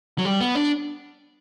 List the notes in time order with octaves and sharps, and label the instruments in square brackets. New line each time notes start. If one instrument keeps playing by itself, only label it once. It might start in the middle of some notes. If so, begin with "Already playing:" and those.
[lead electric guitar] F#3
G3
B3
D4